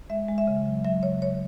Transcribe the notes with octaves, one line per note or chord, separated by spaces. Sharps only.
G#3 E5
G#3
E5
C#3
F#3
F#3 E5
C#3 C#5
F#3 C#5